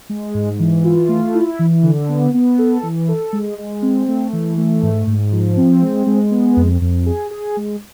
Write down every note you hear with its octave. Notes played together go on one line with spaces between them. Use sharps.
G#3
G#2
E3
F4
A3
E4
E3
D3
B3
B3
A4
E3
A4
G#3
G#3
C4
A3
E3
A3
G#2
G#2
F3
C4
G#3
G#3
B3
F2
F2
G#4
G#4
G#3